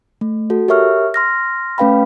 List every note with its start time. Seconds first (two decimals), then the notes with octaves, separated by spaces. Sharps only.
0.21 A3
0.50 F#4 A4
0.68 G4 A#4 C#5 E5 C#6 F6
1.14 C6 F6 A#6
1.78 A3 C#4 B4 F5 G5 B5